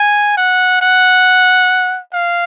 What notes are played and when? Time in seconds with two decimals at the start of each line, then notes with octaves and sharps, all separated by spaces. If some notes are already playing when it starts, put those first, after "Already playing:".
Already playing: G#5
0.38 F#5
0.82 F#5
2.13 F5